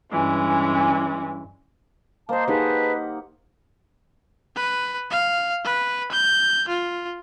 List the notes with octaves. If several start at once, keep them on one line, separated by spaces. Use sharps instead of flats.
G2 E3 G#3 C#4
A#3 C5 D#5 A5
D#4 G4 G#4 B4 C5 F#5 A5
B4
F5
B4
G6
F4